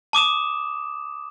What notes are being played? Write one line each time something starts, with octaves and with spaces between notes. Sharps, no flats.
A5 D6 D#6 E7